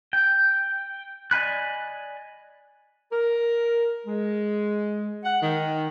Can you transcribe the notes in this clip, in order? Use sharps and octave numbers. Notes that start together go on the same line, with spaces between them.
G5
D5 D#5 G#5 B5 F#6
A#4
G#3
F#5
D#3